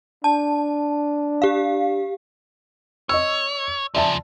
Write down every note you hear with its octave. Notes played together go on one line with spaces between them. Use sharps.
D4 A5
G4 F5
C#5 D#5 C#6 E6
C#3 F3 D5 E5 A5